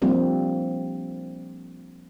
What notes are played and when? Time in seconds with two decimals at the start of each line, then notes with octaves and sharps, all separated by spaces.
0.02 F3 G3 A#3 C4 D4